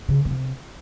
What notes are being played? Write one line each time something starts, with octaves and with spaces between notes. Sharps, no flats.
C#3
A#2
C3